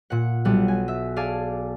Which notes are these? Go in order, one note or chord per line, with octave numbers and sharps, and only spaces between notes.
A#2 F#5
B1 G3 F#5
G#5
E5
G#4 D5 F5 G#5 A5